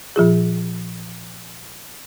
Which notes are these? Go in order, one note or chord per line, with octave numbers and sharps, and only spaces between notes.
A#2 F3 F4 G#4